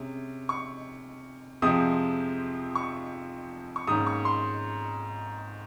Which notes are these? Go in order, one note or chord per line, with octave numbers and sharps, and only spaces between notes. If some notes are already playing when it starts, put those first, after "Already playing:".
Already playing: C3 G#3 C#4
C#6
F2 C3 F3 G#3 D#6
C#6
C#6
G#2 D#3 A#3 C#4 D#6
C#6
C6